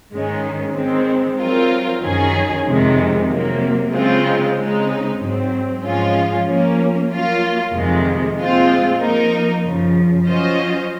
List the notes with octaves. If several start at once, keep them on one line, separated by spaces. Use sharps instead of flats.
G#2 D#3 G#3 C#4
D#3 G#3 C4
F#3 C4 F4 A#4
F#2 D#3 F#3 C#4 G#4
F2 C3 D#3 G#3
C3 F#3 A#3
C#3 G#3 C4 F4
C#3 G#3 C4 D#4
G#2 F#3 C4
G#2 F3 G#3 C#4 F4
F3 A#3 C#4
F#3 A#3 F4
F2 C3 D#3 G#3
A#2 G#3 C4 F4
F3 A#3 D#4 A#4
F#2 C#3 F3
F#3 C#4 F4 C5 D#5